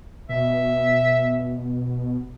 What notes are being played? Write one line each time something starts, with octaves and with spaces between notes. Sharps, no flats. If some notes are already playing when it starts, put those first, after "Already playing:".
B2 E5